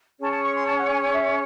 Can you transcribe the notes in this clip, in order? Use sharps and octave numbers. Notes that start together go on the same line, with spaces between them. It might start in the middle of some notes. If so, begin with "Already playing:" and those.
C#4 G#4 C#5 A5
A5
C#6
C6
A5
F#5
G#5
G#5
E5